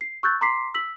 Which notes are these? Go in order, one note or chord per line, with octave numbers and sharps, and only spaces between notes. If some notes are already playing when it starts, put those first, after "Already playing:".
C7
C#6 E6 F#6 G6 A6
A#5 C6 D6 B6 C7
E6 B6 F#7